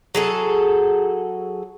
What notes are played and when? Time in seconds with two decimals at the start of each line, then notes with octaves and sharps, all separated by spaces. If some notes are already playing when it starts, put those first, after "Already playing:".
0.15 F#3 G#4 A4